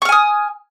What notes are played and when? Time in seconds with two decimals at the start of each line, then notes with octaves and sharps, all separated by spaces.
0.02 C#6
0.05 F6
0.09 G#5
0.12 D#6